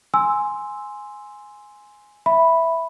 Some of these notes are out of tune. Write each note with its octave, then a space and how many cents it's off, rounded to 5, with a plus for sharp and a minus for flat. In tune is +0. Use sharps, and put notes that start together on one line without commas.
G#5 +0 C6 +0 E6 +0
E5 +0 B5 +0